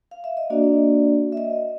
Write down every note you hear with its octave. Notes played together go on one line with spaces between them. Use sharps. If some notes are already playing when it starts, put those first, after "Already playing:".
F5
E5
D#5
A#3 D4 F#4 D5
E5
D#5